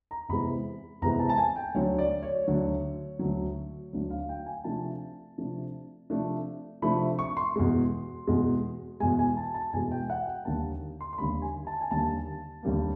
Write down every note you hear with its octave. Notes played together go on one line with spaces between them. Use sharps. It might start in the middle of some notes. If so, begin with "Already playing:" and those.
A#5
E2 C3 E3 G#3 B5
E2 C3 E3 G#3 A#5
A5
A5
G#5
G5
D2 D3 F#3 C#5
D5
C#5
D2 D3 F#3 C#5
D2 D3 F#3
D2 D3 F#3
F5
G5
G#5
C3 F3 A3 D4 A5
C3 F3 A3 D4
C3 F3 A3 D4
C3 F3 A3 D4 B5
C#6
C6
E2 B2 G#3
E2 B2 G#3
E2 B2 G#3 G#5
G#5
A5
A5
E2 B2 G#3 G#5
G5
F#5
G5
D#2 D3 G3 A#3 A5
C6
C6
D#2 D3 G3 A#3 B5
G#5
A5
G#5
D#2 D3 G3 A#3 A5
D#2 D3 G3 A#3